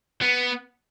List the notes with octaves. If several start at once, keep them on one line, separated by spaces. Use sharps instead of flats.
B3